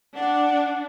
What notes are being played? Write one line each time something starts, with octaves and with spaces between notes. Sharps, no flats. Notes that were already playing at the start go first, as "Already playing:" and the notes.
D4 F#5